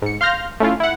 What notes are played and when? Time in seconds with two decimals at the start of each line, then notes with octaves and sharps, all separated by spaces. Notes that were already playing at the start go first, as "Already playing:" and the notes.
0.02 G#2 C#7
0.21 F5 C6 F6 G6 A#6
0.60 A3 C#4 E4 F4
0.80 E4 F#5